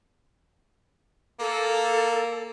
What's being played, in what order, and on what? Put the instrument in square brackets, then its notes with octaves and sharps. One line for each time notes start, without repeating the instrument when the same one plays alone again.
[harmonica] A#3 [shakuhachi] A4